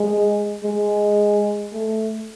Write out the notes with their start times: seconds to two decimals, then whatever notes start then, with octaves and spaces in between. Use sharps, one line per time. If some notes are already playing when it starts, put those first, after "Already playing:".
Already playing: G#3
0.64 G#3
1.73 A3